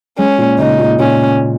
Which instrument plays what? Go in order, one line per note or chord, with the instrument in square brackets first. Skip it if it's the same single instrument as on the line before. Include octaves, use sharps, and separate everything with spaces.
[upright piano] G#3 [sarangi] C#4
[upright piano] A#2
[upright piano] C#3 [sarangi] D#4
[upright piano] A#2
[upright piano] A#2 [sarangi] C#4